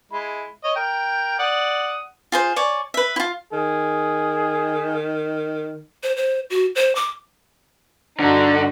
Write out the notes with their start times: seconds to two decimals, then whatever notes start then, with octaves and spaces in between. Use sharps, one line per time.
0.12 G#3 E4
0.64 C#5 D#5
0.76 A#4 G5
1.39 D5 F#5 D#6
2.32 F4 G#4 C5
2.56 C#5 D5 G#5
2.94 B4 E5
3.16 E4 F4
3.53 D#3 G#4
6.03 C5
6.16 C5
6.50 F#4
6.75 C5
6.95 D6
8.20 G2 D3 D#4 F#4